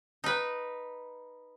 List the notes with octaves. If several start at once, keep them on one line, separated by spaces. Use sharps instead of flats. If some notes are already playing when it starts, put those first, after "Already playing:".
D#4 B4